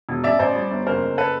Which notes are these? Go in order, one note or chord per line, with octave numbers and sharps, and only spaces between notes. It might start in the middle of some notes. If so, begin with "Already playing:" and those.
E1
A1 D5 E5
A1 C5 D5
G3
G1
F#1 A#4 C5
F#1
A4 B4